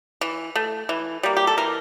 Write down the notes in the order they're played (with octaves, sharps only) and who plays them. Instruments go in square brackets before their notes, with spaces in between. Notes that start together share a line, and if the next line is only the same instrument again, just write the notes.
[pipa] E3
A3
E3
G3 A#3
G4
A4
E3 A#4